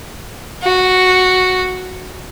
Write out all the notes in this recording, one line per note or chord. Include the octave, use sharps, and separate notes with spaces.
F#4